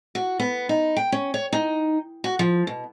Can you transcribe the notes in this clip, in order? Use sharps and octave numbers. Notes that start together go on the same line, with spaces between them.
F#4
B3
D#4
G5
C#4
C#5
D#4
F#4
F3
B2